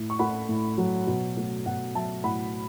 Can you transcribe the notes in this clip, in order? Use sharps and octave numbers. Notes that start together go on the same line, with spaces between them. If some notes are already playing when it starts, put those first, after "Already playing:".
Already playing: A2
C#6
A3 F#5 B5
A2
F#3
B2
A3
B2 F#5
F#3 E5 A5
A2 F#5 B5